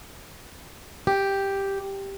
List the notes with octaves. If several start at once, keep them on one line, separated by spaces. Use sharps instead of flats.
G4